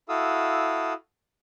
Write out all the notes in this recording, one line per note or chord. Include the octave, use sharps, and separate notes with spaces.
E4 F#4 A4 F5 D#6 E6